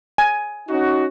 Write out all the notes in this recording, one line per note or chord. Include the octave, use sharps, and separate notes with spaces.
G#5
C#4 D#4 F#4